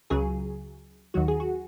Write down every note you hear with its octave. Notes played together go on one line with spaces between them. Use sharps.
C#2 C#3 F#3 G#4
D#2 D#3 F#3 F#4
G#4
F#4